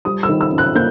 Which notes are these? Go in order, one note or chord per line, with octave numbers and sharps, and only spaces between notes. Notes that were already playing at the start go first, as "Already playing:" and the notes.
G3 D#6
E6
D#3
E6
F#2
F#6
A#3 G6